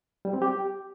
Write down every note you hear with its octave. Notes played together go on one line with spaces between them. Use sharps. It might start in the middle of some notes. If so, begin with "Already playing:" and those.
G3
C4
G4